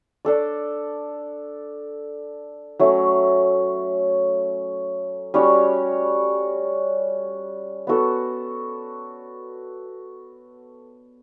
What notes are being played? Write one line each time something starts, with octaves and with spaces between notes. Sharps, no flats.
D4 A4 D5
F#3 A3 C#4
G3 C#4 F#4 C#5
B3 F#4 A4